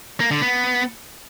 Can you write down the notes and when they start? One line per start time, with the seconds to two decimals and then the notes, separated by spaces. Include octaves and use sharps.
0.20 A#3
0.31 D3
0.42 B3